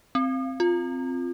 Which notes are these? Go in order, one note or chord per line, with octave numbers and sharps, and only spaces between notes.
C4
F4